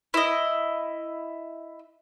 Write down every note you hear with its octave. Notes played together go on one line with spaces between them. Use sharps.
E4 D#5